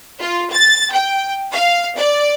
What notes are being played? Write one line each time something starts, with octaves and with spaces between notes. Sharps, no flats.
F4
A6
G5
F5
D5